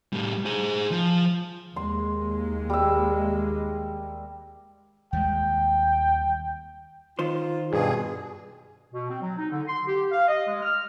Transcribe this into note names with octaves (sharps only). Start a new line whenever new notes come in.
A2 G3
G#4 C5
F3
D#2 G#3 A#3 C6
G3 E5
D#2 G3 G#3 G5
D#3 F4 C5
G2 B2 G#4
B2
C4
F#3
D#4
D3
C6
G4
F5
D#5
G#3
F6